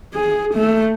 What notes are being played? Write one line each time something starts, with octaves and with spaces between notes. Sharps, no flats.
G#4
A3